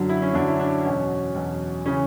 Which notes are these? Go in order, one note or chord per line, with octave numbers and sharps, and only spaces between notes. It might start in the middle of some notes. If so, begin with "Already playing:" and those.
Already playing: F#2 D3 F#3
E4
C#4
F#2 D3 F#3 D4
E4
D4
E2 B2 F#3 C#4
E2 B2 F#3
C#3 E3 C#4